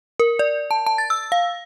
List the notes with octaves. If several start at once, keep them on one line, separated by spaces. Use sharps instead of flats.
A#4
D5
A5
A5
A6
E6
F5